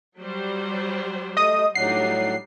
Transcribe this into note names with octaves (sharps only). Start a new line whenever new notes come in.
F#3 G3 C5
A3 D#5 D#6
A2 F#3 G3 D4 D#4 F#5 C7